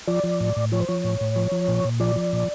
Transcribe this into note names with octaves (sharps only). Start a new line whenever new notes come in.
F3 D5
F3
A2
A2
F3 C#5
C5
F3 C#5
A2
A2
F3
F3
A#2
A#2
F3 D5
F3
A#2